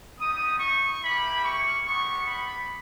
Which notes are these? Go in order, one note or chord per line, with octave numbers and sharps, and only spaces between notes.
G3 B3 D#4 D#6
C#6
A#3 E4 G4 B5
C#6
G#3 B3 G4 C#6
B5